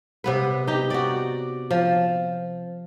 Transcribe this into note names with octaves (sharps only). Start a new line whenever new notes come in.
C3 B3 B4
D#4 G4
F#4 D5
F3